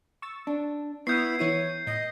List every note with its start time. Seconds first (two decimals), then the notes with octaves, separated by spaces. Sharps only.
0.22 C#6 E6 A6
0.47 D4
1.07 B3 E4 C#6 D#6 F6 G6 C7
1.39 E3 E4 C#5 D#7
1.87 A2 D#5